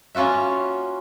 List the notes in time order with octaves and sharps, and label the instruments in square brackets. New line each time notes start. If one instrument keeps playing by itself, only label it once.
[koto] A#3 C#4 F4 F#4 E5